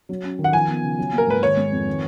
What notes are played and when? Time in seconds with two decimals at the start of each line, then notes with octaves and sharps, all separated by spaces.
0.09 F#3
0.24 C#4
0.39 D#3
0.44 F#5
0.53 F3 G#5
0.68 B3
0.84 C#3
0.98 F#3
1.13 A#3
1.18 A#4
1.28 G#2 B4
1.43 D#3 C#5
1.57 G#3
1.72 F2
1.87 D#3